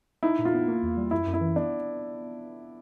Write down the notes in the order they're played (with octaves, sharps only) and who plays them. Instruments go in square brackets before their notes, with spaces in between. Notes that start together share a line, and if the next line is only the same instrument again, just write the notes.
[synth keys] D#4 [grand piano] E4
[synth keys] A#2
[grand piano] F4
[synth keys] B3
A#3
E2
G3
[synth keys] F#2 [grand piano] E4
[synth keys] F#2
[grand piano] E4
[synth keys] E3
[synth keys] B3 [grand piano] D4